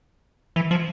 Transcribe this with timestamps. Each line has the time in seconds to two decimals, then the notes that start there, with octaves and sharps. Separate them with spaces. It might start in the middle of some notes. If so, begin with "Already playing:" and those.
0.56 E3
0.71 F3